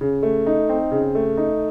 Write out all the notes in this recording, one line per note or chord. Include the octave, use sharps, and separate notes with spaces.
C#3
A3
D#4
C4
C#3
A3
D#4